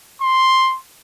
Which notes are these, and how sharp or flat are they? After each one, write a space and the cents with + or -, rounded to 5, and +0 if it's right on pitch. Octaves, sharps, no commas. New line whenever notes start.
C6 +5